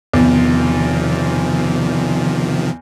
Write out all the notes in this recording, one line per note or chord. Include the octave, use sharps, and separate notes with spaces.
E2 C3 D#3 F3